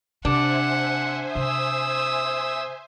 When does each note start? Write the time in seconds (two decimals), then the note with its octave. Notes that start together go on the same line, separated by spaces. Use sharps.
0.25 C3 D4 C5 E5 F#5 G#5
1.35 C3 D#6 E6